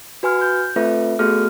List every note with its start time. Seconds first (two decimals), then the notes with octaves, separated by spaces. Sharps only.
0.23 F#4 B4 G#5 C6 F6
0.41 G6
0.76 A3 C4 F4 A4 B4 E5
1.19 A3 B3 F#4 G#4 A4 F6